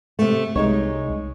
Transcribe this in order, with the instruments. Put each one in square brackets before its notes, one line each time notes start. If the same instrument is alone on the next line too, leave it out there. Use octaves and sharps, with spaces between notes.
[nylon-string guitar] C3 A3
[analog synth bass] C2 [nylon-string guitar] G#3 D#4 C#5